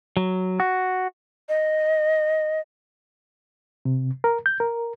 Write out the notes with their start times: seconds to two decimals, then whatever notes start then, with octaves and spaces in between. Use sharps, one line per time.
0.17 F#3
0.60 F#4
1.49 D#5
3.85 C3
4.24 A#4
4.46 G6
4.60 A#4